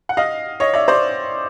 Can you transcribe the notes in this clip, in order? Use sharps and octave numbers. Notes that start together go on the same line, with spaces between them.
F#5
D#5 F5
C#5 D#5
D5 E5
C5 D5